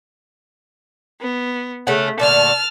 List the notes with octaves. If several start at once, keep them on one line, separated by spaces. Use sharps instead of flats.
B3
C#3 A3 F#5
A#2 D3 A3 A5 F6